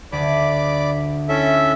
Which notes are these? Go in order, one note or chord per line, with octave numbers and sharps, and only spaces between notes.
D2 D5 B5 D6
C#4 E4 A4 E5